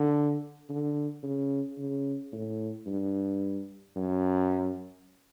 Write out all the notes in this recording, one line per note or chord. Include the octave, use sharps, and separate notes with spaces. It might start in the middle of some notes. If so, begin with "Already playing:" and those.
Already playing: D3
D3
C#3
C#3
A2
G2
F#2